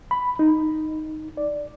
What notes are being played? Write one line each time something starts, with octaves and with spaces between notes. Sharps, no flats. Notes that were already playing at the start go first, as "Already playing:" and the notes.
B5
D#4
D5